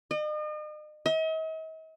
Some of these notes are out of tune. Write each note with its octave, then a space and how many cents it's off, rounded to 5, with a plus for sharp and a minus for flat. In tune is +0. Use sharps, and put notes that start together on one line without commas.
D#5 -40
D#5 +45